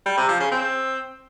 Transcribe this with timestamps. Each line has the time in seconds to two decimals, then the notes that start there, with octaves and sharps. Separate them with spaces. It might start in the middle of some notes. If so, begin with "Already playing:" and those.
0.06 G3
0.18 C3
0.29 F3
0.40 C#3
0.51 C4